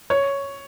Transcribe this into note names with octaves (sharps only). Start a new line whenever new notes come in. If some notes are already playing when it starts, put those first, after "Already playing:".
C#5